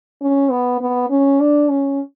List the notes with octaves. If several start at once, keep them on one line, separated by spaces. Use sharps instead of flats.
C#4
B3
B3
C#4
D4
C#4